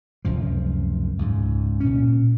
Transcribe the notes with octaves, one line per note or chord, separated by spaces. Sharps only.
F1 C#2 F#2 F3
C#2 G#2
A#2 C#4